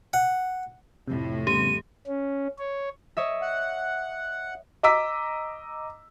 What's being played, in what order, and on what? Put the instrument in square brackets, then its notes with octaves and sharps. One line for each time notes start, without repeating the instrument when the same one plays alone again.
[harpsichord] F#5
[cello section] F2 A2 [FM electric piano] C3
[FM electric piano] C#3 G3 B3 [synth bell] G4 [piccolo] D#7
[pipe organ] C#4
C#5
[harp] C#5 D#5 E5
[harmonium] F#5
[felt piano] D#5 A#5 D6 E6 B6